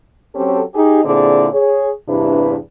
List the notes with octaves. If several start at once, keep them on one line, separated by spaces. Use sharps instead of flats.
F#3 C4 C#4 G4 A4
D#4 G4 G#4
A#2 D3 C4 E4 G#4 D5
G#4 C#5
E2 G2 C3 D4 E4 B4